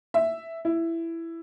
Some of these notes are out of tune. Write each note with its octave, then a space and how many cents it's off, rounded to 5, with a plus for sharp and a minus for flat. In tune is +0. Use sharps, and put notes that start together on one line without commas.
E5 +0
E4 +10